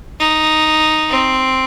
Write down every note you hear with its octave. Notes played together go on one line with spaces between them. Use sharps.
D#4
C4